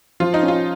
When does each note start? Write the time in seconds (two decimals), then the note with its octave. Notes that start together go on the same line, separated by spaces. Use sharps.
0.20 F3 F4
0.34 D#4
0.42 C#4
0.48 F4